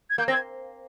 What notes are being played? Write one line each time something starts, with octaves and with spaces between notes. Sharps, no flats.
G#6
A#3 G6
C4 A#6
G#6